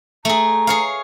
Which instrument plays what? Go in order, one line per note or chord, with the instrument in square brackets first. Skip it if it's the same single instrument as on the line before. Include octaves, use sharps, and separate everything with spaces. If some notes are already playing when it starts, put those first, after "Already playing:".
[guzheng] A3 G#4 [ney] A#5
[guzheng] G#4 C#5 F5